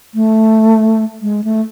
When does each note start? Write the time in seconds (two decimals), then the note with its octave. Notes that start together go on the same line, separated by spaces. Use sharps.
0.15 A3
1.22 G#3
1.44 A3